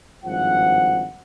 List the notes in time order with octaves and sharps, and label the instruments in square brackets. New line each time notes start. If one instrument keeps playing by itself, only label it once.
[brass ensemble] G#1 G2 F3 F#5